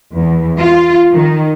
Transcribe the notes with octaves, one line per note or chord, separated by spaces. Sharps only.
E2
F4
D#3